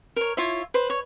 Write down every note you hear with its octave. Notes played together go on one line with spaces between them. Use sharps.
A#4 C#5
E4 F4 C#5 E5
B4 C5
C#5